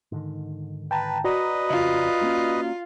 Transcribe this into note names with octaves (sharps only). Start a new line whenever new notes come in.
G#2 D3 D#3
B4 G5 A5 A#5
F#4 B4 D5 D#5 A#5
F2 C#3 F4
G2 A#3 C#4